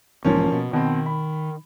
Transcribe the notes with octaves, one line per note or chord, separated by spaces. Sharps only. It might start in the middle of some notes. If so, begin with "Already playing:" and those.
B1 G#2 E3 F3 A#3 C#4
B2
B2 D#3 C4
B5